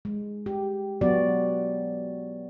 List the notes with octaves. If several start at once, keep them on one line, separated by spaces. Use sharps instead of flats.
G#3
G4
F#3 B3 F#4 D5